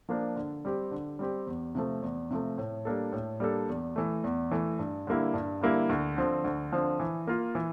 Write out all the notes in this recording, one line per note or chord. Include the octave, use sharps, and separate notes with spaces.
F3 A#3 D4
D3
G3 C4 G4
D3
G3 C4 G4
E2
C3 F3 A3
E2
C3 F3 A3
A2
G3 A#3 D4 A4
A2
G3 A#3 D4 A4
E2
E3 A3
E2
E3 A3
G2
D3 G3 A#3 E4
G2
D3 G3 A#3 E4
D2
D3 F3 C4
D2
D3 F3 C4
E3
A#3 F4
E3